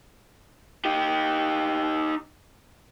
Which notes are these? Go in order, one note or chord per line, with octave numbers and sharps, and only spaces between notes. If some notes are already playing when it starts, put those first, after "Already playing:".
D#4 G4